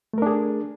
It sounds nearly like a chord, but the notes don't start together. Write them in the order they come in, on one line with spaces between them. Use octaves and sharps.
A3 A#4 D4 G#4